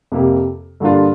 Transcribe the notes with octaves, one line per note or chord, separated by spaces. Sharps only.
F2 C3 A#3 G4
G2 D3 A#3 D4 F4